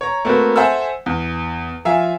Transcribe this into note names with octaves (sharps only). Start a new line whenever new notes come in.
C#5 A#5
A3 A#3 C4 F#4 A#4 B4
A4 C5 E5 F#5 G#5 E6
E2
F3 E5 F5 G#5